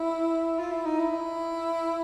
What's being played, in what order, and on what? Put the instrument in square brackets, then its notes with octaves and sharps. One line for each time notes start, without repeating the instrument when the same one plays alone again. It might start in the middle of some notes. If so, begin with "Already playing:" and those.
Already playing: [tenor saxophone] E4
F4
E4
D#4
E4